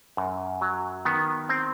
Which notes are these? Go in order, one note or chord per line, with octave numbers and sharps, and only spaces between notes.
F#2
F#3
D#3 B3
C4